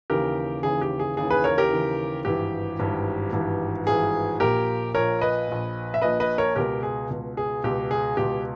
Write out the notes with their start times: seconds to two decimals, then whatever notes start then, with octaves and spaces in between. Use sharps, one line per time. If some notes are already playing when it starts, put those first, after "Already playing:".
0.10 D#2 C#3 E3 G4 A#4
0.63 D#2 C#3 E3 G#4
0.81 G4
0.99 G#4
1.17 D#2 C#3 E3 G#4
1.30 G#4 B4
1.44 A#4 C#5
1.58 G4 A#4
1.71 D#2 C#3 E3
2.25 G#1 G2 E3 G4
2.79 G#1 G2 E3
3.33 G#1 G2 E3
3.87 G#1 G2 E3 G#4
4.40 A#1 A#2 G4 A#4
4.94 A#1 A#2 A#4 C#5
5.21 B4 D#5
5.48 A#1 A#2
5.94 E5
6.02 A#1 A#2 B4 D#5
6.20 B4 D#5
6.38 A#4 C#5
6.56 C#2 B2 G4 A#4
6.83 G#4
7.10 C#2 B2
7.37 G#4
7.64 C#2 B2 G4
7.91 G#4
8.17 C#2 B2 G4